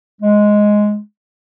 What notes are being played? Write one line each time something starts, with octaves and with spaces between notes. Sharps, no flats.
G#3